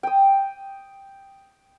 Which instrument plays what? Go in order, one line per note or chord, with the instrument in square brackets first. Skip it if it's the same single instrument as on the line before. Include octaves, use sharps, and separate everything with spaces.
[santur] G5 D#6